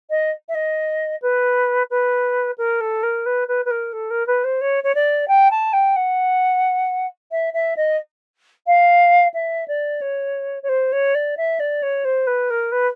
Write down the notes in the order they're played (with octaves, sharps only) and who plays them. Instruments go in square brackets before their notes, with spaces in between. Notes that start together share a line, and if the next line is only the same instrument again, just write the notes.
[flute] D#5
E5
D#5
B4
B4
A#4
A4
A#4
B4
B4
B4
A#4
A4
A#4
B4
C5
C#5
C#5
D5
G5
A5
G5
F#5
E5
E5
D#5
F5
E5
D5
C#5
C#5
C5
C#5
D5
E5
D5
C#5
C5
B4
A#4
B4